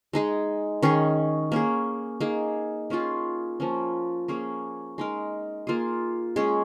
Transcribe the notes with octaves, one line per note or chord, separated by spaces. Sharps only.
G#3 D#4 G#4
D#3 C#4 G#4
A#3 C#4 G#4
A#3 D#4 G#4
A#3 C#4 F4 G#4
F3 A#3 C#4
A#3 C#4 G#4
G#3 D#4 A#4
A#3 F4 G#4
G#3 C#4 G#4